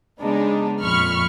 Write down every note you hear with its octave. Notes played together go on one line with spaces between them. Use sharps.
C#3 G#3 B3 D4 D#4
F2 A#2 B5 C#6 F6